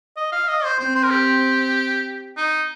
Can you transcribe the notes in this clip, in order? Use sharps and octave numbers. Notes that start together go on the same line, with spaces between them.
D#5
F5
D#5
C5
C4 C5
C5
A#4
G4
D#4